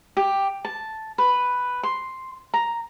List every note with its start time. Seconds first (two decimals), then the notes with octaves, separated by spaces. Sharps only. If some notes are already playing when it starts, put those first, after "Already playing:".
0.17 G4
0.65 A5
1.18 B4
1.83 C6
2.54 A#5